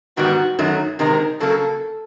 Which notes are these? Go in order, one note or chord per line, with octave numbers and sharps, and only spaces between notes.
G#2 D#3 G3 B3 F#4
F#2 D#3 F#3 A3
C3 D#3 G#3 C4 A#4
C#3 F#3 A#3 A4